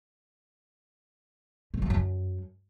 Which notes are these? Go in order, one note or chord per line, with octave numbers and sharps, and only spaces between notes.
A#2
F#3
F#2